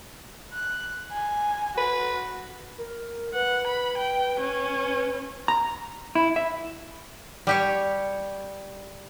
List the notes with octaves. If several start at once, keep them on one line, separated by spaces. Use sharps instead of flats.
F#6
G#5
F#4 B4
A#4
B4 F#5
B5
G5
C#4
A#5
E4
E5
G3 G4 C#5